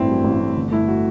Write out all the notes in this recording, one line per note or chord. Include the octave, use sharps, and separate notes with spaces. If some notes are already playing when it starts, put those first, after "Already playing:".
Already playing: A1 G2 A3 C4 E4
F#3
A1
A3
G1
A3 E4
F#4